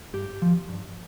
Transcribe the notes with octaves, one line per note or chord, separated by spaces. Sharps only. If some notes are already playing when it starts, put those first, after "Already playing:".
G2 G4
F3
G2